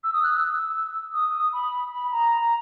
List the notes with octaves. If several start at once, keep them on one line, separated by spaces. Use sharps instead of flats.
E6
D#6
F#6
E6
D#6
B5
B5
A#5